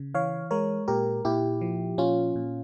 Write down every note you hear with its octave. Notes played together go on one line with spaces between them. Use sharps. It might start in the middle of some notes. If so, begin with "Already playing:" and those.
Already playing: C#3
E3 C#5 F5
G#3 A#4 C#5
A#2 G4 A#4
A#2 E4 G4
F3
A#2 C#4 F4
A#2